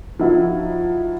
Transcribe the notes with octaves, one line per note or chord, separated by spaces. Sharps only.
F3 D#4 E4 F#4